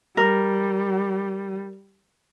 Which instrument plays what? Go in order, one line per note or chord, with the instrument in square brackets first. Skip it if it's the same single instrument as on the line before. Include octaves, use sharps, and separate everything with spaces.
[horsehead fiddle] G3 [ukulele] A#4